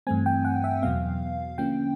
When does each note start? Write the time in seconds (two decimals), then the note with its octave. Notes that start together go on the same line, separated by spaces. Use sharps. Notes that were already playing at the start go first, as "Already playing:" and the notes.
0.07 G2 E3 A3 C4 G#5
0.26 G5
0.45 F#5
0.64 E5
0.82 E2 B2 F#3 B3 F5
1.58 D3 F3 A#3 C#4 G5